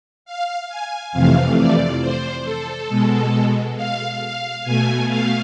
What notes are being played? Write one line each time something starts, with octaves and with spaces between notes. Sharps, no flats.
F5
G#5
F2 C3 E3 A3 F5
D5
C5
A4
B2 G#3
F5
F5
B2 A3 G#5
F5